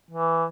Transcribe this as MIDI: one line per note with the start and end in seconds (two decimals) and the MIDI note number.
0.10 0.45 52